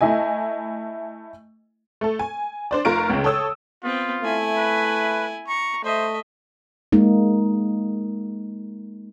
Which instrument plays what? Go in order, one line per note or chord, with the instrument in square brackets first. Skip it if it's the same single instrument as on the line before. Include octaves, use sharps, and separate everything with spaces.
[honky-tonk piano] A3 E4 D#5 G#5
A3 A4
G#5
D4 C5 D5
F1 F4 A#4 C#6 D7
C#2 C#3
A4 C#5 D#6 E6
[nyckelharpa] B3 C4 [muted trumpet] F4
[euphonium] A3 [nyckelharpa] E4 G#5
[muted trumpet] B4
[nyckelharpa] A#5 [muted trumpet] C#6
[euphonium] A3 [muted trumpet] C5 [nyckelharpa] D#5 E5
[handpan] G#3 A#3 D#4